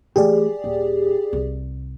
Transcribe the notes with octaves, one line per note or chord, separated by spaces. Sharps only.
E3 A3 G4 G#4 D5
D#1
C2